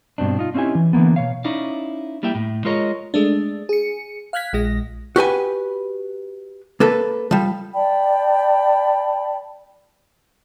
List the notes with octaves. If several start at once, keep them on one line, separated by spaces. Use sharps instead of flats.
G2 B2 C4 D4
D#4 F4
C4 C#4 D#4 E4 G4 G#5
E3
D3 E3 F3 A#3 B3
B2 C#5 F5
C#4 D#4 E4 D5 F5
G3 A#3 E4 E5 G5
A2
G#3 F4 G#4 A#4 C#5 D#5
G#3 A3 D4
G#4 C#7
F5 F6 F#6 G#6 B6
A#1 G#3 A#6
F#4 G4 B4 G#5
A#3 A4 B4
F3 G3
D5 G5 A5 B5